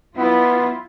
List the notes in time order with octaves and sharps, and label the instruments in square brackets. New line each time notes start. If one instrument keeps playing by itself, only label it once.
[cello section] F#3 E4 F4 [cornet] B3